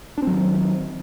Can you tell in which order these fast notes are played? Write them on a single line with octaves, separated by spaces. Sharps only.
D4 C4 F#3 D#3